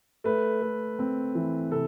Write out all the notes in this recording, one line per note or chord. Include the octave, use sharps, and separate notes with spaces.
A3 B4
A3
C4
E3
C3 A4